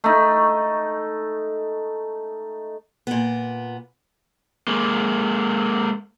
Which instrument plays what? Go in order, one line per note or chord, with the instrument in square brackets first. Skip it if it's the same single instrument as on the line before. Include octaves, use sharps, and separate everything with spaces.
[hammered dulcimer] A3 D#4
[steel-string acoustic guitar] A#2 B3
[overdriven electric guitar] G#3 A#3